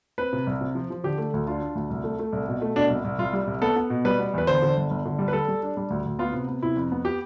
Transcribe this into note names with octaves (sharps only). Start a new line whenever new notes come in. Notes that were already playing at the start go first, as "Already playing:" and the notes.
C4 B4
C3
C2
C3
F3
F3
D3 G4
A3
D2
D4 F4
D4
D2
C2
A3
A3
C2
B2
A3
B2 D4
C2
C2
C2 F4
G3
C2
B3 A4
B3
B2
G3 B4
B3
E2 B4
D3 C5
D3
G1
G1
D3
G3
B4
G3 A4
G3
D4
G3
D2
D2
B3 F4
C3
B3
C3 E4
F2
B3
G4